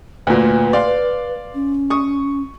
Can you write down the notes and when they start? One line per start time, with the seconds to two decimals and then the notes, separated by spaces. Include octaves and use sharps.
0.27 D2 A#2 B4
0.73 D5 F5 C6
1.54 C#4
1.90 C#6 D#6